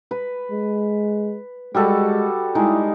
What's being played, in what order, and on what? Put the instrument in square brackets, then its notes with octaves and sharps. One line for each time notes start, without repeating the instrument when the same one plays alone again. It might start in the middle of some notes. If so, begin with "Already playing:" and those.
[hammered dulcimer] B4
[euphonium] G#3
[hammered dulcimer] G3 F#4 A4 [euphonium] G#3
[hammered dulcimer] G3 G#3 D#4 [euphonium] E4